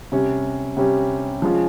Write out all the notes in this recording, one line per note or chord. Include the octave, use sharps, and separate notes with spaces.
C3 G3 C#4
C3 G3 C#4
F3 G#3 C#4 F4